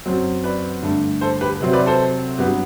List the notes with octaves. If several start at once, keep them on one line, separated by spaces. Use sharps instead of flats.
F#2 F#3 C4
B4 D5
G2 D3 A3
A4 C5
G4 B4
C3 F#3 C4
B4 D5
A4 C5
G2 F#3 B3 G4 B4